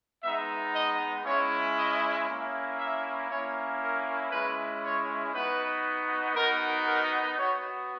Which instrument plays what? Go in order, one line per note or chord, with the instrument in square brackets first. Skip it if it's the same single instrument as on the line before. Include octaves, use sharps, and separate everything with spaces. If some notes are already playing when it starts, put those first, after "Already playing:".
[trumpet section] G#3 B3 D#4 E5
D#5
G#3 C#4 E4 C#5
D#5
A#3 C#4 E4
E5
A#3 C#4 E4 C#5
A#4
G#3 C#4 E4 B4
C#5
B3 D#4 F#4 B4
B3 D#4 F#4 A#4
A#4
B3 F#4 C#5